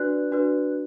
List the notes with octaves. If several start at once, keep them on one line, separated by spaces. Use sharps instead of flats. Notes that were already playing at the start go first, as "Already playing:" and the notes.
Already playing: D4 F#4 B4 D5 F#6
D4 F#4 B4 D5